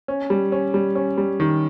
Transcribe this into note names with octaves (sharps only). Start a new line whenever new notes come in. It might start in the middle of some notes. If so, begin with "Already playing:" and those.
C#4
G3
C#4
G3
C#4
G3
D#3